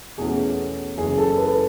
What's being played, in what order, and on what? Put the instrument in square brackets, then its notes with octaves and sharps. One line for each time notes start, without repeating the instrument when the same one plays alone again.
[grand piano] E2 B2 A3 C#4 G#4
F#1 F#2 E3 G#4
A4
B4